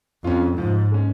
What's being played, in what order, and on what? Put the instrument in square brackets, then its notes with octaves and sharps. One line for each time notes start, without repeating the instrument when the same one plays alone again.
[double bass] F2 [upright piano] C#4 F4
[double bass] G#2 [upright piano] F3
[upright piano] G#3 C#4